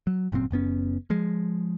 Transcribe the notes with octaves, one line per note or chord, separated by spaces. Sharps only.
F#3
G1 F#2 A#2 C4
F#1 F#2 B3 C#4
F3 G#3